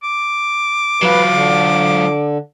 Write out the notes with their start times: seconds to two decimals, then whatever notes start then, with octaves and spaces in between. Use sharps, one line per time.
0.03 D6
1.02 F#3 F4 B4
1.33 D3